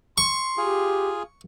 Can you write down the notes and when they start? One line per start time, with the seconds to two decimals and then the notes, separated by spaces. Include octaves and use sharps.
0.18 C6 C#6
0.58 F4 G4 G#4